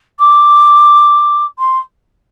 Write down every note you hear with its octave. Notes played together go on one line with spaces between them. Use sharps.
D6
C6